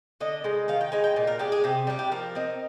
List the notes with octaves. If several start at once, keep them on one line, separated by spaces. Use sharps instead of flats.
D3 D#5
G#3 D#4
D#3 F5
G5
G#3 D#4 G#5
G5
A#2
A#4
G#3 D4 G4
G#4
C3 G4
G3 D4 G4
G4
F3 A#4
C4 D#4